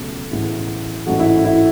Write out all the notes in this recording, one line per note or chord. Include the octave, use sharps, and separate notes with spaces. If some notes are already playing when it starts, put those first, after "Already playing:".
Already playing: C#2 B2 F#3 A3
A1 A2 G#3 B3 E4
A1 G#2 E3 A3 F#4
E4
E4